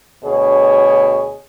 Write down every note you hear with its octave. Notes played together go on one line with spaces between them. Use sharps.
D2 B2 G#4 C#5